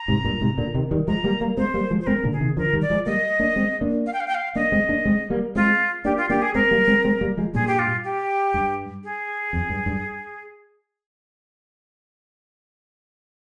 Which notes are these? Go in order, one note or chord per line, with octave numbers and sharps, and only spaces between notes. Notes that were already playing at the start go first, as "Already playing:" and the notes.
Already playing: A#5
G#2 C3
G2 A#2
G#2 C3
A#2 D3
C3 D#3
D#3 G3
F3 G#3 A#5
G3 A#3
G3 A#3
G#3 C4 C5
G3 A#3
F3 G#3
C5
G#3 C4 A#4
A#2 D3
G#4
C3 D#3
D3 F3 A#4
D#3 G3
D5
F3 G#3
G3 A#3 D#5
A#3 D4
G#3 C4
A#3 D4
F5
G5
F5
G5
F5
A#3 D4 D#5
G#3 C4
A#3 D4
G#3 C4
G3 A#3
G#3 C4 F4
A#3 D4 G4
F4
A#3 D4 G4
G#4
G#3 C4 A#4
G3 A#3
G#3 C4
G#3 C4
G3 A#3
F3 G#3
G2 A#2 G#4
G4
F4
G4
G2
G#4
F2
G2
G2